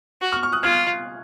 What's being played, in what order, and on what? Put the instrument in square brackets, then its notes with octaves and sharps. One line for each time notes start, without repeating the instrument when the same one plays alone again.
[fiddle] F#4
[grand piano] C#6 F6
C#6 F6
D#6 F#6
[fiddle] F4 [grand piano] F6 G#6